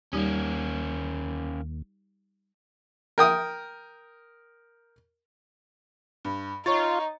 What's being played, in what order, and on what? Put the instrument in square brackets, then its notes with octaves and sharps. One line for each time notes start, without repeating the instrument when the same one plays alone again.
[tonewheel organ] D#2 [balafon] G3 D#4 G4 [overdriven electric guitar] A#3 C#4
[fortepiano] A#4 G5 D#6
[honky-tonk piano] G2
[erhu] D#4 [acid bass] F4 [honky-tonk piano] C#5 C#6 A6